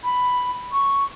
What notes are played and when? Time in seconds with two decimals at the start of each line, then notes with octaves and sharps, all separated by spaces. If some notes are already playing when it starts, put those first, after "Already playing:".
0.04 B5
0.72 C#6